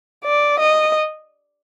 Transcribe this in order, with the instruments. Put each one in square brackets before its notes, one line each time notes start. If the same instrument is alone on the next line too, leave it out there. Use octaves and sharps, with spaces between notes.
[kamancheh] D5
D#5